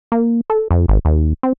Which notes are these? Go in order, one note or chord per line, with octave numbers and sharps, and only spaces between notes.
A#3
A4
F2
G#1
D#2
C4